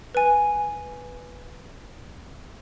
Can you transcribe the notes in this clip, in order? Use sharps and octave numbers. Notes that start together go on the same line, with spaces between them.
B4 G#5